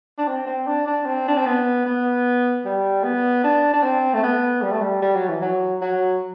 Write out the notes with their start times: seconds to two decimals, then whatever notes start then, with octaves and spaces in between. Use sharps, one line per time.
0.18 D4
0.28 C4
0.47 C4
0.67 D4
0.87 D4
1.06 C4
1.28 D4
1.38 C4
1.46 B3
1.86 B3
2.65 G3
3.04 B3
3.44 D4
3.73 D4
3.83 C4
4.14 A3
4.23 B3
4.62 G3
4.72 A3
4.82 G3
5.02 G3
5.15 F#3
5.29 E3
5.42 F#3
5.81 F#3